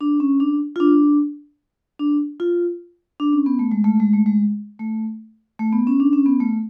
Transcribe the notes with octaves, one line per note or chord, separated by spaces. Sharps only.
D4
C#4
D4
F4
D4
D4
F4
D4
C#4
B3
A3
G#3
A3
G#3
A3
G#3
A3
A3
B3
C#4
D4
C#4
B3
A3